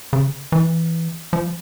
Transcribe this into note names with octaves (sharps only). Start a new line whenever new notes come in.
C#3
E3
F3